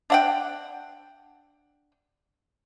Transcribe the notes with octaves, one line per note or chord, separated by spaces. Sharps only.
D4 F#5 G5